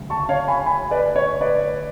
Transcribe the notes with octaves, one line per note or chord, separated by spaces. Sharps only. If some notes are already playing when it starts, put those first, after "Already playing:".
Already playing: D2 C#3 F#3
A5 C#6
C#5 F5
G#5 B5
G#5 B5
B4 D5
C#5
B4 D5